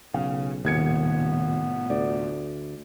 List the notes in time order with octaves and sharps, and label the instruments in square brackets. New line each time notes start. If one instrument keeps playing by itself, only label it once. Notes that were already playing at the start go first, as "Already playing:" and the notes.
[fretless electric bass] B1 [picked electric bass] C#3 [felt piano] F5
[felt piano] D#1 G#6 C#7 [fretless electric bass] D#2 [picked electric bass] A2 C3 [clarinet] B3
[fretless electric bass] D2 [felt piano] D5